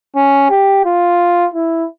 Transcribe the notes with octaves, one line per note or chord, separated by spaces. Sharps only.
C#4
G4
F4
E4